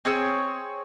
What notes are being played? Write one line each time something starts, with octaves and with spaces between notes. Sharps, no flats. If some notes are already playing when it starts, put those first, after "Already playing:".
C4 G#4 C#5 E6